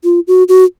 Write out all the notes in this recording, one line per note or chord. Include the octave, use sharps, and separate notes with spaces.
F4
F#4
F#4